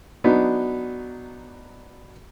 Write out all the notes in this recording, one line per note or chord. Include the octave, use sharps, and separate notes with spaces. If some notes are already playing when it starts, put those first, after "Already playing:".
F#3 B3 D4 D#4